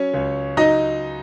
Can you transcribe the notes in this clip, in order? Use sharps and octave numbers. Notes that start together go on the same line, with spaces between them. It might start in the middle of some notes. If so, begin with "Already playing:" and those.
Already playing: F#3 C#4 C#5
C#2
F#3 D#4 D#5